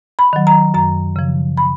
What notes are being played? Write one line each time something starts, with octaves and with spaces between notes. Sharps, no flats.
B5
D#3 F#3
A#5
F#2 A#5
C#3 F3
B5